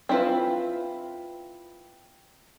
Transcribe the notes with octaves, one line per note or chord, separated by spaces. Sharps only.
C4 D4 E4 F4 B4